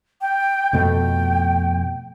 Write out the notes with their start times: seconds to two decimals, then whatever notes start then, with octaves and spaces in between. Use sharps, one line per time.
0.21 G5
0.73 F2 B2 A3 G5